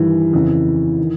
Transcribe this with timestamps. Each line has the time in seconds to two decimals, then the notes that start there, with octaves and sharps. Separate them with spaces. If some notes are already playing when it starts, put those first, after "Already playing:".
Already playing: G2 D#3 E3
0.33 F2 C#3 E3
0.98 D#3